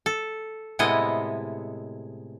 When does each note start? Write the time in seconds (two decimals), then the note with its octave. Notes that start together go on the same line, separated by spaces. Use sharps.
0.06 A4
0.79 A2 C3 G#3 B3 E4 D#5